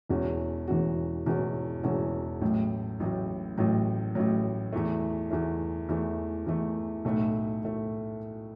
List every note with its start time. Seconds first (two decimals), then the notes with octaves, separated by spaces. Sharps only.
0.09 E1 E2 E3 C#4 F#4
0.67 E1 E2 E3 C#4 F#4
1.26 E1 E2 E3 C#4 F#4
1.83 E1 E2 E3 C#4 F#4
2.41 A1 A2 F#3
3.00 A1 A2 F#3
3.58 A1 A2 F#3
4.15 A1 A2 F#3
4.73 E2 E3 A3
5.30 E2 E3 A3
5.89 E2 E3 A3
6.47 E2 E3 A3
7.05 B1 A2 A3
7.64 A2 A3